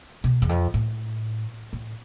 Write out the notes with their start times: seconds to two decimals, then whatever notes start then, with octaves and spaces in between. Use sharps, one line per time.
0.24 B2
0.42 E2
0.49 F2
0.74 A2
1.73 A2